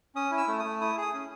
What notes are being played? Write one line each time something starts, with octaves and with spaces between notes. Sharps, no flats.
C#4 D#6
E4
E6
A3
D#6
A3
E4 D#6
G#4 D#6
C#4